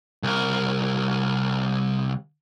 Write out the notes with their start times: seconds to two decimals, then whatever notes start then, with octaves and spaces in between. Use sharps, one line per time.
0.23 C2 A#4